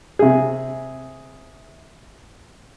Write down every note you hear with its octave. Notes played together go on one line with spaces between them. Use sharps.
C3 G#4